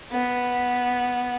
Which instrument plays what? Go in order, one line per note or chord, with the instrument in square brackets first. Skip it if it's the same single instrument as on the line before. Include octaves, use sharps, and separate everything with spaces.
[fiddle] B3